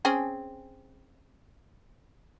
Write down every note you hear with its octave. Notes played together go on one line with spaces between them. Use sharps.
C4 C#4 G#4